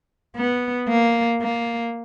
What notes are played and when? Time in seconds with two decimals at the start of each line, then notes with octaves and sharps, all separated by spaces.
0.36 B3
0.89 A#3
1.42 A#3